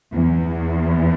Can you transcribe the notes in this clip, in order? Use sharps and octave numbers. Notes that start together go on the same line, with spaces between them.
E2